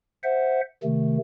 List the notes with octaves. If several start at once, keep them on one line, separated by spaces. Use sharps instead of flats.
C5 E5 F#5
C3 D#3 A3